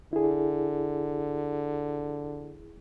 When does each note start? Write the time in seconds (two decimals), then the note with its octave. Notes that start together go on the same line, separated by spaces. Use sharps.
0.13 D3 E4 G#4